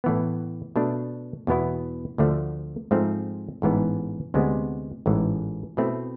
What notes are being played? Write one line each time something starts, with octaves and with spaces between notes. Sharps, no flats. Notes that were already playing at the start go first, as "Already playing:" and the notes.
A2 E3 B3
B2 A3 D4
E2 B2 B3 E4
D2 D3 F3 A3
G#2 F3 A3 C4
A1 G#2 E3 B3
D2 C3 G#3 B3
A1 G#2 E3
B2 A3 C4 E4